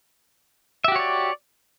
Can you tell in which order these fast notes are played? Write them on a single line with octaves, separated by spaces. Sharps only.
E5 G4 F#4 C#5 D5